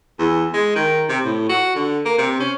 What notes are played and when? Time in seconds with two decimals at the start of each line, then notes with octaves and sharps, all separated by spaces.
0.19 E2
0.54 G#3
0.76 D#3
1.10 C3
1.25 A2
1.49 F#4
1.76 D3
2.06 A#3
2.18 C3
2.40 C#4